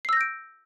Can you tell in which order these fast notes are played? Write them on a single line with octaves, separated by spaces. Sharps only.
C7 E6 A#6 G6 D7